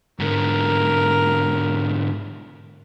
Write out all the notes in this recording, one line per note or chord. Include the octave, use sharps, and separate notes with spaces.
G#2 D3 A#4